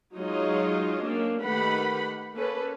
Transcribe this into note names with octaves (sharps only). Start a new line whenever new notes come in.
F#3 G#3 D#4 F4 C#5 D#5
A#3 C#4 D4
D#3 A3 G4 B4 F#5 B5
A#3 C#4 A4 B4